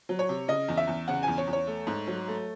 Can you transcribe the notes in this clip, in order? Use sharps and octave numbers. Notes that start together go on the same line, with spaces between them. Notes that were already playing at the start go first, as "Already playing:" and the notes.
F#3
C#5
C3
C#3 D#5
E2
E5
E2
C#3 F#5
G#5
E2
C#5
E2
C#5
A3
G#2
F#3
A3